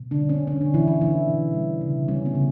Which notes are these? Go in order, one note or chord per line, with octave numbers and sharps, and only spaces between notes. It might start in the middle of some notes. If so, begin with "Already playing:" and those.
Already playing: B2
D3 D4
G3
C#4
B2 C#4
D3 D4
B2 E3 E4
E3 E4
E3 A3 E4
B2
G3
C#3
G3 C#4
B3
C#3